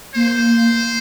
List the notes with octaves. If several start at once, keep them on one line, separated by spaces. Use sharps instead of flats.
A#3 C5